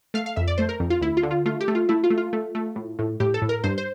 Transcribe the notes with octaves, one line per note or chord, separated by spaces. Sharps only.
A3 F5
F5
F2 E5
D5
A3 C5
A#4
F2
F4
D2 E4
F4
D3
F4
A3 F4
G4
A3
F4
A3 E4
F4
A3
F4
A3
A3
A2
A2
A2 G4
A4
A2
A#4
G2 C5
C5